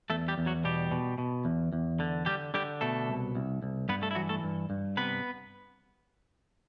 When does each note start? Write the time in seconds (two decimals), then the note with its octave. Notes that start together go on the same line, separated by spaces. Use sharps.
0.10 E2 A3 A4
0.28 G3 G4
0.38 E2
0.46 F#3 F#4
0.64 B2 G3 G4
0.91 B2
1.18 B2
1.45 E2
1.73 E2
2.00 D3
2.26 D3 G3 G4
2.54 D3 G3 G4
2.81 B2 A3 A4
3.08 C2
3.35 C2
3.62 C2
3.89 G2 B3 B4
4.02 A3 A4
4.11 E4
4.15 E3 F#3 F#4
4.29 A3 A4
4.44 G2
4.70 G2
4.97 C3 B3 B4